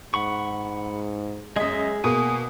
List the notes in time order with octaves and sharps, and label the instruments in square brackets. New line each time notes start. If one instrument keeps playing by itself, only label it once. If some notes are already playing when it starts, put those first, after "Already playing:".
[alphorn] G#2 [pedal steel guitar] F#5 B5 C#6
[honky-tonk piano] F#2 D#5 [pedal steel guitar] G#3 E5 [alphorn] G#4
[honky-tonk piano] B2 A#3 [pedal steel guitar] G#5 D#6